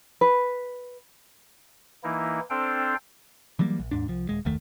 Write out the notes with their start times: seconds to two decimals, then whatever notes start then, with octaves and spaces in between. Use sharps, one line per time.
0.21 B4
2.04 E3 A#3 D#4 E4
2.50 C4 D4 A4 C5 F5 G5
3.59 E3 F#3 G3 A#3
3.79 A#1
3.91 D#2 G#2 D4
4.08 C2 F3
4.29 D#1 G#3
4.45 F#1 D#2 D#3 A3